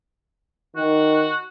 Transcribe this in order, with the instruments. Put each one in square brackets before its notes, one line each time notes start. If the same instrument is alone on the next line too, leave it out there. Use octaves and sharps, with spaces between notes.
[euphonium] D#3 [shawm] F#4